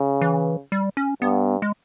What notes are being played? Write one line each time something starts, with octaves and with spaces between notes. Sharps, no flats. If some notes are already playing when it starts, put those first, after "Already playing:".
Already playing: C#3
E3
G3
C#4
G2 B3
G#3